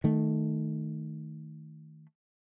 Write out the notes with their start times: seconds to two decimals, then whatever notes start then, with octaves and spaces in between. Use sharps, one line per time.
0.04 D#3 A3